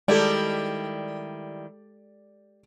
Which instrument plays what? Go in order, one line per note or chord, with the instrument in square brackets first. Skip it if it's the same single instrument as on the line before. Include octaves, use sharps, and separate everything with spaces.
[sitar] D#3 G3 E4 [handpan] G#3 A4 [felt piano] G4 D5